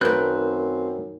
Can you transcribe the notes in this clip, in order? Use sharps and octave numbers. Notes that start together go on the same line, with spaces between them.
F#2 D#3 A3 C4 A#4 B4 F#6 G6